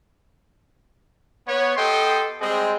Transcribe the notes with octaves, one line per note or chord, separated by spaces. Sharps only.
B3 C#5
B3 G4 A4 D#5 G5 C6
G3 G#3 C4 G#4 D#5